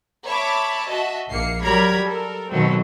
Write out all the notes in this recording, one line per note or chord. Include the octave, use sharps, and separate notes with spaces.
C#5 E5 A5 B5 D6
F#4 D#5 E5 A5
A#1 A#3 C7 C#7
F#3 G3 A#4 A#5 B5 G#6
A4 A#4
B2 D#3 F#3 A3 C4